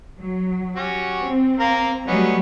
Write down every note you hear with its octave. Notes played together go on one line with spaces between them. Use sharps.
F#3
C#4 F#4 G4
C4
A#3 A#4 F5
F#3 G3 A3 B3 C#4 D#4